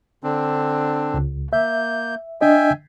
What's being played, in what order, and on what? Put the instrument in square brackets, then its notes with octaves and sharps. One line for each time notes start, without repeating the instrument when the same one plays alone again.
[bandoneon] D3 C4 D4
[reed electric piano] C#2
[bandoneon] A#3 G6 [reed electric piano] E5
[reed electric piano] D4 D#5 [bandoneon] E5 G5 G#5